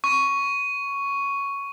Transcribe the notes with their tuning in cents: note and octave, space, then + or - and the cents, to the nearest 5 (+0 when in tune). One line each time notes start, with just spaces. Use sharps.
C#6 +5